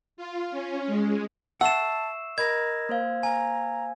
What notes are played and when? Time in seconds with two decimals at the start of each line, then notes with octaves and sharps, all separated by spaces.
0.17 F4
0.51 C#4
0.87 G#3
1.61 E5 F#5 A5 C#6 E6 C7 E7
2.38 A#4 D#5 B5 G#6 A#6
2.89 A#3 C5 F5
3.23 G#5 A#5